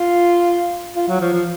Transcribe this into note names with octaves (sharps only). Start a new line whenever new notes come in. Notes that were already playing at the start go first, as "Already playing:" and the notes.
Already playing: F4
F4
F#3
F3
F3